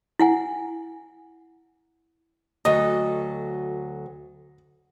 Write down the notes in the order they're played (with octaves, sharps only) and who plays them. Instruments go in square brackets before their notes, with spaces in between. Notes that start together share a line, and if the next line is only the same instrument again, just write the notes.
[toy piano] E4 F#5 G#5
[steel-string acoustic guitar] D2 F#3 A4 [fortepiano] D#5